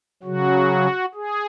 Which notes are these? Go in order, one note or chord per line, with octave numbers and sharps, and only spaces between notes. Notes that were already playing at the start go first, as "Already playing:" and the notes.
C#3 F#3 F#4
G#4